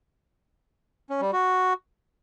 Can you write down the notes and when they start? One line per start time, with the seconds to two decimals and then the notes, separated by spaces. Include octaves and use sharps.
1.10 C#4
1.21 G3
1.33 F#4